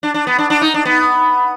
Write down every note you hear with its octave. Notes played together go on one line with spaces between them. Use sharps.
D4
D4
B3
D4
D4
D#4
D4
B3